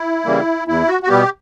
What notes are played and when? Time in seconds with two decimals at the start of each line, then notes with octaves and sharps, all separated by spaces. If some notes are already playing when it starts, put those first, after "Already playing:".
Already playing: E4
0.25 C#3 E3 G3 A#3
0.68 E2 E4
0.88 F#4
1.03 F#4
1.08 B2 G3 B3 G4